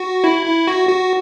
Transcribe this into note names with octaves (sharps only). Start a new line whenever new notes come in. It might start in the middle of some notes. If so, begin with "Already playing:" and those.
Already playing: F#4
E4
E4
F#4
F#4